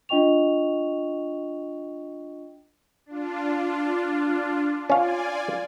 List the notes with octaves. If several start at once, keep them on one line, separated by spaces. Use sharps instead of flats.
D4 F4 D#5 G5 C#6 F7
D4 F4
C#4 F4 D5 F5 G#5